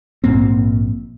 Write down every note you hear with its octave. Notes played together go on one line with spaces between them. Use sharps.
A#1 G#2 A#3 C4